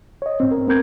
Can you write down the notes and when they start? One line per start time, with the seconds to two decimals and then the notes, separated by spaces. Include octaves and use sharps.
0.22 C#5 D#5
0.40 G#2 C4
0.51 A#4
0.67 B3 C4 A#4 G6 G#6